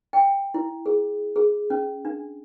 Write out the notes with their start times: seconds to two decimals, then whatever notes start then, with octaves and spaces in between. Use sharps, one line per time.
0.13 G5
0.54 E4
0.86 G#4
1.36 G#4
1.70 C#4
2.05 D4